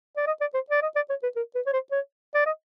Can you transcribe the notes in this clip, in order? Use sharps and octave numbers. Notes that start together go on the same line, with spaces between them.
D5
D#5
D5
C5
D5
D#5
D5
C#5
B4
A#4
B4
C#5
C5
C#5
D5
D#5